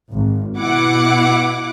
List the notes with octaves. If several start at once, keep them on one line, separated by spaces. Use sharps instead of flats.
G#1
B2 E4 F#5 D6